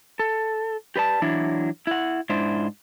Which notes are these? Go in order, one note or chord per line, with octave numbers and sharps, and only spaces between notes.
A4
G4 B4 D5 A5
E3 F#3 D4 E4
E4 F#5
G#2 D4 E4 C5